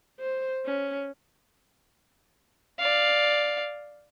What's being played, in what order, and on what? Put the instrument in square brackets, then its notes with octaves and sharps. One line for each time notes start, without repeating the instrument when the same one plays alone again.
[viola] C5
C#4
[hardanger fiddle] D5 F5